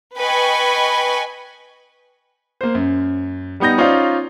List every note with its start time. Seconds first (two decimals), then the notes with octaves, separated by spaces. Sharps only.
0.17 B4 D#5 G5 G#5 B5 C#6
2.61 A#3 C5
2.75 F#2
3.60 G3 B3 D#4 G6 A#6
3.78 C#4 D#4 F4 C5 D5 F5